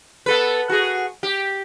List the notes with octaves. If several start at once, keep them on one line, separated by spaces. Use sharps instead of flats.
B3 A4 B4
F#4 G#4
G4